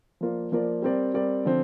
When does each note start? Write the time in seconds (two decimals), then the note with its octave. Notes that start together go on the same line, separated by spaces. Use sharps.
0.21 F3 A#3 F4 A#4 D5
0.52 F3 A#3 F4 A#4 D5
0.82 G3 C4 A#4 D5
1.14 G3 C4 A#4 D5
1.45 D3 F3 C4